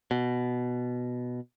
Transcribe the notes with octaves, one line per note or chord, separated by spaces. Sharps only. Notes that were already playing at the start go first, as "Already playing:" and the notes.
B2